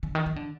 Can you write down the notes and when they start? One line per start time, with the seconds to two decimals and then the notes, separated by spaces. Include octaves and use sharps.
0.03 D3
0.15 D#3
0.26 D#3
0.36 D3